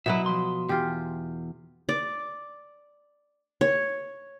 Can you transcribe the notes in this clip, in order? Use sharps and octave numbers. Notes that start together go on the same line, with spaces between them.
B2 F#3 E4 B4 E5
F3 C6
E2 F4 G4
D5
C#5